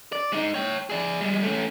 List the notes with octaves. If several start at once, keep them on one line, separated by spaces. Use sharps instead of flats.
D5
G#3 D#4
C#5 G5
G#4 D5
G3 G#3
A3 C#4